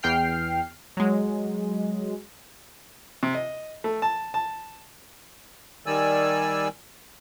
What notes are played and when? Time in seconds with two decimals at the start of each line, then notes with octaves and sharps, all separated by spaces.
0.03 E2 G5 F6 C7
0.97 F#3 G#3
3.23 C3
3.35 D#5
3.84 A3
4.02 A5
4.34 A5
5.86 D#3 G3 D5 G#5 E6